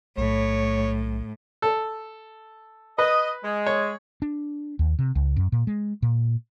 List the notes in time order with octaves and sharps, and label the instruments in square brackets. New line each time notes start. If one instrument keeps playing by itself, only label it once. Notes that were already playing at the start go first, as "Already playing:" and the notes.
[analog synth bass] B1 [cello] A2 [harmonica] C#5
[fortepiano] A4
[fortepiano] B4 [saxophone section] D#5
[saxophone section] G#3
[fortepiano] C#5
[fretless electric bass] D4
D#2
C3
C#2
F#2
A#2
G#3
A#2